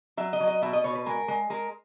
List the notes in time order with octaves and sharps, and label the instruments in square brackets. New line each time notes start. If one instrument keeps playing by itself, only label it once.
[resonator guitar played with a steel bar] F#3 E5
D#5
F#3
D#5
B2 E5
D#5
B2 C#5
B4
G#3 A#4
G#3
G#3 A#4